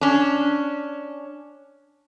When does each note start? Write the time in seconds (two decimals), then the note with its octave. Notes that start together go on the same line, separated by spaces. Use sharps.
0.01 C#4 D4